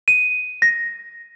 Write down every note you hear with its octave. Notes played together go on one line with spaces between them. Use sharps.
D#7
A#6